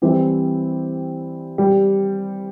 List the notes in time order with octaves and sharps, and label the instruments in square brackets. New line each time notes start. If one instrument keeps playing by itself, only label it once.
[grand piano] E3 C4 E4 [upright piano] G3 G4
[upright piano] G3 G4